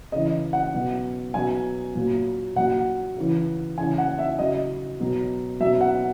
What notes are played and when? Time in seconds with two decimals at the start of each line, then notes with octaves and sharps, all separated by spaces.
0.12 C#3 E3 D#5
0.53 F#5
0.74 B2 F#3
1.34 B2 F#3 G#5
1.95 A#2 F#3
2.56 A#2 F#3 F#5
3.17 C#3 E3
3.78 C#3 E3 G#5
3.98 F#5
4.19 E5
4.39 C#3 F#3 D#5
4.99 B2 F#3
5.60 B2 F#3 E5
5.81 F#5